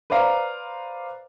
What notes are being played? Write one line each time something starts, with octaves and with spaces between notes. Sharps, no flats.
B4 C5 D5 F5 A#5